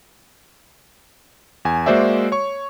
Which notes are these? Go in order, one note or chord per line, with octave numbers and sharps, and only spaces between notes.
E2 G#5
G#3 A#3 F#4 C5 D5 E5
C#5 C#6